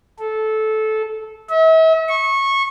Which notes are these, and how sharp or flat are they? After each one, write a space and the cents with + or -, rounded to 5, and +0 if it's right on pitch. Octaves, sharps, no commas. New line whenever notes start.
A4 -15
E5 -40
C#6 -20